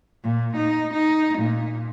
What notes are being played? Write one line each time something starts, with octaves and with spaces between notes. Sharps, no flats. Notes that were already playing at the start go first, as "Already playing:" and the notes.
A#2
D#4
D#4
A#2